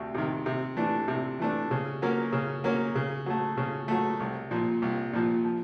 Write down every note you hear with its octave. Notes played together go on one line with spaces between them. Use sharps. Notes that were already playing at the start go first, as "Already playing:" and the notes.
Already playing: D2 C3
C3 D#3
C3
E3 A3 D4
C3
E3 A3 D4
C#3
F#3 A#3 C#4
C#3
F#3 A#3 C#4
C#3
F#3 A3
C#3
F#3 A3
C2
A#2 F3
C2
A#2 F3
F3